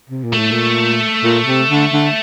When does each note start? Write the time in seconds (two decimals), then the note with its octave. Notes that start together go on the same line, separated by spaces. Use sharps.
0.09 C3
0.24 A#2
0.33 A2 A3
0.51 A#2
1.24 A#2
1.47 C3
1.69 D3
1.93 D3